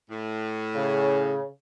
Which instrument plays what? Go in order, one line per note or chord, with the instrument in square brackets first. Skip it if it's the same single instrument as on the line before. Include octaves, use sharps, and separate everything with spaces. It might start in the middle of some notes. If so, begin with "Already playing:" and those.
[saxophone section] A2
[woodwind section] C#3